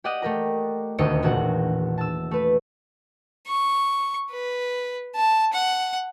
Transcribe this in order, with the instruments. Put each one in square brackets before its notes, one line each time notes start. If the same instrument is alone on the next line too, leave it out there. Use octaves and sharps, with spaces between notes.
[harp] G4 D5 D#5 F#5 D#7
A3 G4 A#4 A#5
D#1 D2 G4 D#5 C#7 D#7
E1 A#1 A#2 F#4 F#5
A5 E6
A3 B4
[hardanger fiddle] C#6
B4
A5
F#5